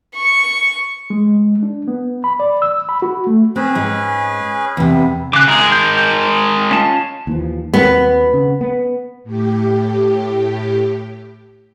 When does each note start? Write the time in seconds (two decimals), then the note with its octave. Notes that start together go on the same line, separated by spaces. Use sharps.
0.15 C#6
1.10 G#3
1.63 D4
1.88 B3
2.24 B5
2.40 D5
2.62 E6
2.89 B5
3.02 F#4
3.27 A3
3.56 C4 C#4 G#4 B4
3.75 G#2 G#3
4.77 E2 C3 B3
5.33 C#3 D6 F#6
5.48 G#3 G#4 A#4
5.72 G6
6.71 C#4 F4 A5
7.27 D#2 E3 F3
7.74 D#2 F#3 B3 C4
8.34 C#3
8.61 B3
9.24 A2 G4